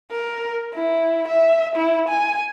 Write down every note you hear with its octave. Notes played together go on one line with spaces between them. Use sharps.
A#4
E4
E5
E4
G#5